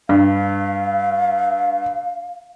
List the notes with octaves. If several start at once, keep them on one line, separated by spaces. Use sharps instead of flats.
G2 F5